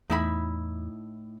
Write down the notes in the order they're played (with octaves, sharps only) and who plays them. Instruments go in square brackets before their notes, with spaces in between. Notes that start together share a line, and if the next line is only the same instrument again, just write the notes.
[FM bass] E2 [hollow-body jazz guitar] A2 [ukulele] D#4 E4 B5